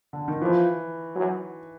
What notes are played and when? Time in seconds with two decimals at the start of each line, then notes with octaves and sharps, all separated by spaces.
0.13 D3
0.28 D#3
0.41 E3 F3
1.15 F#3